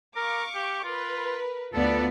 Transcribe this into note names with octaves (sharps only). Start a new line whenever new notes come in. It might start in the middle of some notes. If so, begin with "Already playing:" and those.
A#4 F5 C#6 D6
G4
F4 A#4 B4
D2 B3 F4 A4 B4 D5